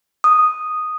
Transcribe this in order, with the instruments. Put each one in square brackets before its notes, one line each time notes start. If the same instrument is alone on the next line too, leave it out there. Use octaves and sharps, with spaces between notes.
[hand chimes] D#6